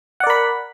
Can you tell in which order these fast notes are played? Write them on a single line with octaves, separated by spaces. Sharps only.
F#5 D5 A#4 B5